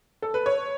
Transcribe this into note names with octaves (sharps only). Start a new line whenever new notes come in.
A4
B4
C#5